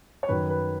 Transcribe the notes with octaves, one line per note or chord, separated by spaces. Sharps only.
C#5
F#2 D#3 B4
B4